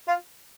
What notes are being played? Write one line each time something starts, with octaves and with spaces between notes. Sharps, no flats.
F4